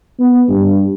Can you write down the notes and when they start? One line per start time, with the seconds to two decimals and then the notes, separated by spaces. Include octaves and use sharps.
0.20 B3
0.48 G2